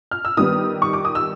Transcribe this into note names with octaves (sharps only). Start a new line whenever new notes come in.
F6
E6
D#3 G3 B3 D#6
C#6
D6
D#6
E6